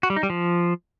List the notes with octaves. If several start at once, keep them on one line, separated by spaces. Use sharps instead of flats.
F#4
G3
D#4
G3
F3